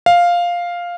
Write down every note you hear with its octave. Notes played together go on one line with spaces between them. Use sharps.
F5